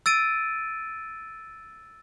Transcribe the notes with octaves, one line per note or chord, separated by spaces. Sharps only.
E6 A6 D7 D#7